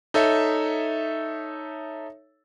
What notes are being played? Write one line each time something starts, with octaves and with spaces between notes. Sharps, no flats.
D#4 A4 C#5 E5